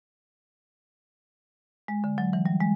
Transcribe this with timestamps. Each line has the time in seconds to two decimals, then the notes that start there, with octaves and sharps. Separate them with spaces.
1.88 G#3
2.04 D3
2.18 F#3
2.33 E3
2.46 G3
2.60 G#3